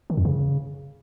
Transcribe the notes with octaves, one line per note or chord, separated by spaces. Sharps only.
D#3
F2
C#3